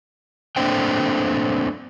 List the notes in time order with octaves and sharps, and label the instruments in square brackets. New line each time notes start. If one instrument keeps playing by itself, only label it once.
[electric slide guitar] A3 A#3 C4 D4 C5 G5